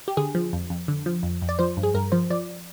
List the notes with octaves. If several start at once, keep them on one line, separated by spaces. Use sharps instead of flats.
G4
D3 G#4
F3
F2
F2
D3
F3
F2
F2
D5
F3 C5
G2
G#4
G2 A#4
F3 C5
F3 D5